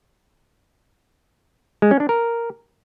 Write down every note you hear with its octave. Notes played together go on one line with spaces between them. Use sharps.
G#3
C#4
D4
A#4